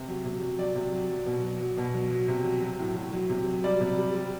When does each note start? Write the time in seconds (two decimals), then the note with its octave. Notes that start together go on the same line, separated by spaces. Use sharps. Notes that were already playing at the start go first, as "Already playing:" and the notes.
Already playing: C3
0.08 F#3
0.25 C3
0.42 F#3
0.59 F#3 D5
0.75 C3
0.93 F#3
1.10 F#3
1.26 B2
1.43 F#3
1.61 F#3
1.77 B2
1.94 F#3
2.11 F#3
2.28 C3
2.45 F#3
2.62 F#3
2.79 A2
2.96 F#3
3.13 F#3
3.29 C3
3.46 F#3
3.64 G3 D5
3.81 C3
3.97 G3
4.15 G3